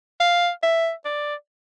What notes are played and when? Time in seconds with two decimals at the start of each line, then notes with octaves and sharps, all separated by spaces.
0.20 F5
0.63 E5
1.05 D5